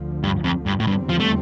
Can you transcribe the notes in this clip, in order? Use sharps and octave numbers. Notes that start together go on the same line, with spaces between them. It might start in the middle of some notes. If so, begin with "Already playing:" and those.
Already playing: D2 D3 F3
G2
F2
G2
A2
E2 G2 D3 G3 C4
F3
A3